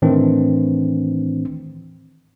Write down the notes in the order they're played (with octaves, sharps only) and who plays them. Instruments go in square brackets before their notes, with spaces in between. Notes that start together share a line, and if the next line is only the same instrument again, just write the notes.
[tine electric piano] A2 D#3 E3 C4 D4